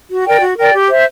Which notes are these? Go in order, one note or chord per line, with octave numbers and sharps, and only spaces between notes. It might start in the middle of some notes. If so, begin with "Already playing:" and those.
F#4
A#4 D5 G5
F#4
A#4 D5 G5
G4
C5 E5